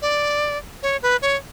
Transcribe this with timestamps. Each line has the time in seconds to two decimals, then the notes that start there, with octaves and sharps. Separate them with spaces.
0.02 D5
0.83 C#5
1.02 B4
1.22 C#5